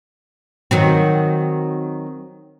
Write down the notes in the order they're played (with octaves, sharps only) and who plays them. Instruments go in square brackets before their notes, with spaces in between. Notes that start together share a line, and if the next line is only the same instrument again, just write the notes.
[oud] D#3 F#3 C4